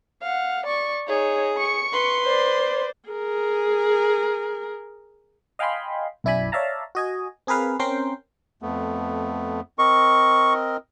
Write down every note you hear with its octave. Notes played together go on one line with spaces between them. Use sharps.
F5 F#5
D5 C#6
D#4 G#4 C#5
C#6 C#7
B4 C6
C5 D5
G#4 A#4
D#5 F5 G5 G#5 B5 C6
B1 F#2 E4 D5 G#5 B5
C#5 D5 E5 F5 A5 A#5
F#4 D#5 G#5
C4 G#4 A#4 B4 F5
C4 C#4 A#4 C5 G5 C6
F2 A3 B3
C4 A#4 D#5 C#6